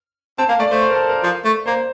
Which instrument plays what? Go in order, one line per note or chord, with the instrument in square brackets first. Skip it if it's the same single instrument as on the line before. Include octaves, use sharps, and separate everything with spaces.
[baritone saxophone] C4 [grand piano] A5
[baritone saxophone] A#3 [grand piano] F5
[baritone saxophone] A3 [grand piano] D5
[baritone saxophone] A3 [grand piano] C5
[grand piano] C5
A#4
A4
A#4
[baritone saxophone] F3
A3
[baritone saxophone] A#3 [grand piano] C5